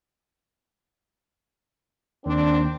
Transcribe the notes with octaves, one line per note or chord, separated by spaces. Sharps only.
D#2 C4 D4